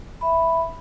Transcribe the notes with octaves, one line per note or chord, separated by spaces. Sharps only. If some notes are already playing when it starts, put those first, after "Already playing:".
E5 B5